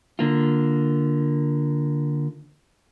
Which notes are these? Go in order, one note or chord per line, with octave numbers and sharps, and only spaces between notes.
D3 A#3 F4